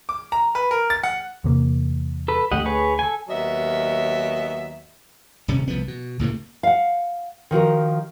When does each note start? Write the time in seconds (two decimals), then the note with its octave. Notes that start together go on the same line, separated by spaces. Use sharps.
0.09 D6
0.32 A#5
0.55 B4
0.71 A#4
0.90 A6
1.03 F#5
1.44 E2 C3 A#3
2.28 A4 B4
2.52 D2 G#3 A3 G4 D#5 F#5
2.66 G#4 B4 C#5
2.99 A4 G#5
3.29 D#2 F#3 B3 D#5 E5
5.48 D#1 C3 C#4
5.68 C2 F3 B3
5.88 B2
6.19 C#2 A2 C3 A#3
6.63 F5 F#5
7.51 D#3 F3 F#4 A#4